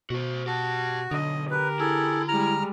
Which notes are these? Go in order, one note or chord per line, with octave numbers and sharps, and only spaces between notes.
B2 F#4 C5
F#4 G4 A5
B1 D3 D#5
G4 A#4 B4
E4 G#4 A4
G3 G#3 A#5 F6